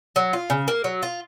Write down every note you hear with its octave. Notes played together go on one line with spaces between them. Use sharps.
F#3
F4
C#3
A#3
F#3
F4